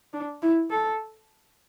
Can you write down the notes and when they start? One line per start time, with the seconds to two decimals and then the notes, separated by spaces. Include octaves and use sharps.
0.14 D4
0.42 E4
0.71 A4